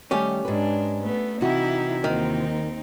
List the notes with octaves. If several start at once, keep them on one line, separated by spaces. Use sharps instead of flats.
D#3 G3 A3 C#4 G4
G#2 G#3 D4 B4
A3 B3
C3 E3 D#4 E4 F#4
D#2 D#3 C4 D#4